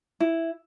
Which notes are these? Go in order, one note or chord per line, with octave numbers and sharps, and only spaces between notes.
E4